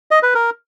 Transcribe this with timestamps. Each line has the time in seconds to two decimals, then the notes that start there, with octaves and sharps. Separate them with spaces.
0.11 D#5
0.23 B4
0.34 A#4